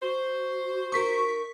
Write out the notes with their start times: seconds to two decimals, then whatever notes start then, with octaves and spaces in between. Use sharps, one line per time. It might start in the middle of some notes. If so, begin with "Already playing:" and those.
0.02 F#4 C5
0.92 D#4 A#4 C#6 B6